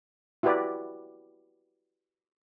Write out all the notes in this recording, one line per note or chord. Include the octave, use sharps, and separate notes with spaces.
E4 F#4 G4 B4 D5